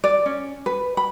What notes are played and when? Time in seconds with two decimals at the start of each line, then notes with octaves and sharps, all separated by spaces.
0.04 D5
0.26 C#4
0.66 B4
0.97 B5